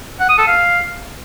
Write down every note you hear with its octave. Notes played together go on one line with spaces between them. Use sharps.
F#5
D#6
A4
F5